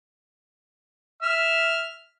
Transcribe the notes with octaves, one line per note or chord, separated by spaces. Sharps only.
E5 F6